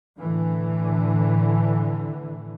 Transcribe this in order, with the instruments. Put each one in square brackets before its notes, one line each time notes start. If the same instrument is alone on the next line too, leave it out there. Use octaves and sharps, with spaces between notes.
[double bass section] A2 D3 E3